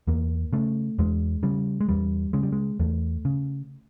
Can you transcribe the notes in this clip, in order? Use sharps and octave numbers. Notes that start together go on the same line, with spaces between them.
E2 A#3
C#3 A3
E2 G#3
C#3 G3
G#3
E2 G3
C#3 G#3
G3
G#3
E2 A3
C#3